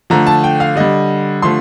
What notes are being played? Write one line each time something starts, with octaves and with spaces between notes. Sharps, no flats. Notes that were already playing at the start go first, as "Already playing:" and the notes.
D3 F3 A3 A#5
A5
G5
F5
D3 G3 D#5
D3 F3 A3 C6